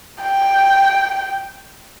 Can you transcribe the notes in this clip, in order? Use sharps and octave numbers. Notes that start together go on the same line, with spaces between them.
G5